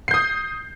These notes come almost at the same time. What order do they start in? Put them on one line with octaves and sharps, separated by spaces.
C7 G6 D#6